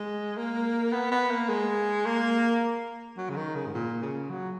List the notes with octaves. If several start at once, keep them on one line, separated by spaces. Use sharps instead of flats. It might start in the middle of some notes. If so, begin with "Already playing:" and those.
Already playing: G#3
A#3
B3
B3
A#3
G#3
A#3
F#3
C#3
D#3
C#3
G#2
A#2
C#3
F#3